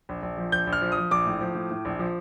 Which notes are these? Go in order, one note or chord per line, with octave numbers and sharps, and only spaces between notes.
A#1
A#1
F3
A#1 G6
A#1
F6
F3
D#6
F3
A#1 D6
A2
F3
A2
A2
A#1
F3